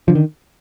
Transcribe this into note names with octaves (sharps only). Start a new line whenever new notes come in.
D3 F3
D#3